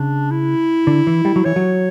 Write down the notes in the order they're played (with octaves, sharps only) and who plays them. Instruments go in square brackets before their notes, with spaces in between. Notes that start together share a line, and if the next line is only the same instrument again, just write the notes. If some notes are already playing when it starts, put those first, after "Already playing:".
Already playing: [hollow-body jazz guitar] C#3 [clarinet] D4
[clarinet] E4
[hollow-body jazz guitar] D3
E3
G3
F#3
[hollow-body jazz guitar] E3 [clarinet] C#5
[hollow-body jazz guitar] F#3